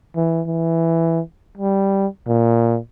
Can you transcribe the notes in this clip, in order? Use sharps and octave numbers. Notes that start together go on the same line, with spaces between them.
E3
E3
G3
A#2